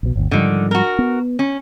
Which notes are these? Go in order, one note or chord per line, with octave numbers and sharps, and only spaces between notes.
A#1 B2
G1 D2
G#2 D3 D#3 F3 G3
F#4 A#4
B3
C#4